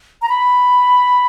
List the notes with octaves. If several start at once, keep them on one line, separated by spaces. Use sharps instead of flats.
A#5
B5